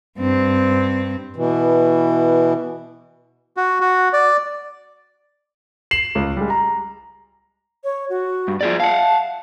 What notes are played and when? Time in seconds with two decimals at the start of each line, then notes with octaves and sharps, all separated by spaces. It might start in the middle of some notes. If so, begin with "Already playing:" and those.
0.19 G2 C4
1.36 B2 E3
3.57 F#4
3.81 F#4
4.13 D5
5.91 C7 E7 F#7
6.15 C#2
6.37 G3 G#3
6.50 A#5
7.84 C#5
8.10 F#4
8.48 G2
8.61 F4 G#4 D5
8.80 F5 F#5 A5